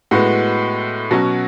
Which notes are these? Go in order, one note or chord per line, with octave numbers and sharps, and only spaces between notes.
A2 G#3 B3 F#4
B2 F#3 C#4 F#4